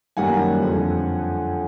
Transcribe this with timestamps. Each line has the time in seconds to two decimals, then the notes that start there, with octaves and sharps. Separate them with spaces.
0.17 F#2 D#3 G3 A#3 F#5 G#5
0.59 F2 D3 F3